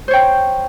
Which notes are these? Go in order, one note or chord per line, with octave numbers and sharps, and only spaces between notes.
C5 C#5 G5